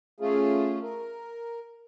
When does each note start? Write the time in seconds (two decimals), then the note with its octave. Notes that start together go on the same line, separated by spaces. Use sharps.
0.20 A3 C#4 F4 G#4
0.82 A#4